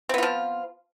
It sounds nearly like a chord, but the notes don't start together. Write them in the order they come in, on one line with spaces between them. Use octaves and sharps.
C4 B3 F4 F3